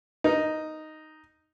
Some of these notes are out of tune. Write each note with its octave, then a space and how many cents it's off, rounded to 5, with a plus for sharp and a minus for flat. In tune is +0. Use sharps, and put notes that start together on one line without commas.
D#4 +0 A#4 +0